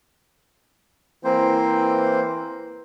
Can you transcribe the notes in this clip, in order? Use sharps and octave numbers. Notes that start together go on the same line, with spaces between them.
E3 A#3 C4 C5